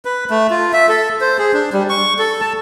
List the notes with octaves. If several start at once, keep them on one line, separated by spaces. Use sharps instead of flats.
B4
A3
F4
E5
A4
C5
G#4
D4
G3
C#6
A4
A5